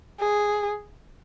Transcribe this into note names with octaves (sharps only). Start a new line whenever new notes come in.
G#4